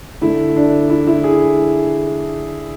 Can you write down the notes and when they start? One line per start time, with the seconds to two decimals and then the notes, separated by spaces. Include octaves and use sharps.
0.21 D3 A3 D4 E4
0.56 D4
0.90 E4
1.07 E4
1.24 G#4